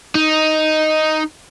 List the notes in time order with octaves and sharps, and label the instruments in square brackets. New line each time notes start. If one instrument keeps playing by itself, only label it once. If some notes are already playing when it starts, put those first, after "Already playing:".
[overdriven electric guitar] D#4